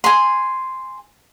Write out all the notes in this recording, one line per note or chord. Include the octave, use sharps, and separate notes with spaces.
G#5 C6